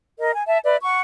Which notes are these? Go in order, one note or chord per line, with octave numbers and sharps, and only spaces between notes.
A#4 D#5
G#5
E5 A5
B4 D5 E5
F#5 C#6